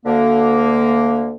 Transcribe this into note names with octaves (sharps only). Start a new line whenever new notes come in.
D2 D3 A#3